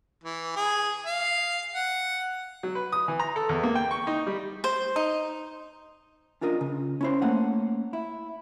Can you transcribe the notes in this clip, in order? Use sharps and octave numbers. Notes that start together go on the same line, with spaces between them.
E3
G#4
F5
F#5
F#3
B4
D#6
E3
A#5
A4
E2
A#3
G5
C#6
D#4
G3
C5
D#4
C#4 D4 F4 A#4 D#5
C#3
C#4 E4 C5
A3 A#3 C#4 F#5
E4